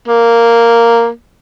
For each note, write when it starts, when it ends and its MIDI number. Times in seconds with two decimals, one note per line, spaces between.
0.08 1.08 58